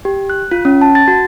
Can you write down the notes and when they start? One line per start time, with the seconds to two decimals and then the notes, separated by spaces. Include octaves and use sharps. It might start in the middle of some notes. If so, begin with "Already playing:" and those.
0.05 G4
0.30 F#6
0.51 F4
0.65 C#4
0.81 A5
0.95 A6
1.08 F#4